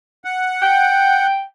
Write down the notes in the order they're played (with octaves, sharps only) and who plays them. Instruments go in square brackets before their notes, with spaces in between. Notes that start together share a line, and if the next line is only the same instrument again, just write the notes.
[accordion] F#5
[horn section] G5